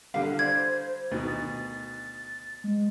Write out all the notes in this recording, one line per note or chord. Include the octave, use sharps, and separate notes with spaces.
D3 G3 F5
C5 D5 G#6
D2 B2 D#3 A6
G#3